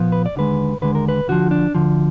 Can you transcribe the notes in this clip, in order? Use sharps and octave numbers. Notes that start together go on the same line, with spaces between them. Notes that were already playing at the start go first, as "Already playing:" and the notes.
Already playing: A#2 F3 B3
B4
D5
D#2 D3 G#3 B4
D#2 D3 G#3 B4
A#4
B4
D2 D3 F3 F#4
D4
D2 D3 F3